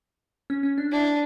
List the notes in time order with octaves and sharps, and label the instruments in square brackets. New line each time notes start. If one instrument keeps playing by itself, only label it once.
[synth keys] C#4
C#4
D4
[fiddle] D4 [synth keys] E4